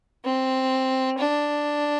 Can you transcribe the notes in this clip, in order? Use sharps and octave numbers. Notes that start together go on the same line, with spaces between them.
C4
D4